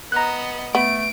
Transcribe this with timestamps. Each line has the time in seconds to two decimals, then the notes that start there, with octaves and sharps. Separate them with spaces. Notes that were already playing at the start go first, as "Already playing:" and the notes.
0.12 B3 D#5 A#5 F#6
0.75 A3 B3 D7